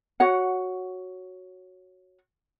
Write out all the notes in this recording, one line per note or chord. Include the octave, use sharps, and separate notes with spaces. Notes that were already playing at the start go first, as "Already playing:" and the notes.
F#4 C#5 F#5